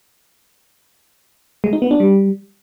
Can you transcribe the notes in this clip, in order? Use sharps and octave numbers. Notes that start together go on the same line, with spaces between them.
G#3
D#4
B3
D4
G3